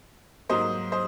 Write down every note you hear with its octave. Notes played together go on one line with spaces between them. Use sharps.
G#2 F#3 A#3 C5 D#5
C5 D#5